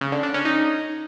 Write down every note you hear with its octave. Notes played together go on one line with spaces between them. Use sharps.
C#3
D3
D4
C#4
D#4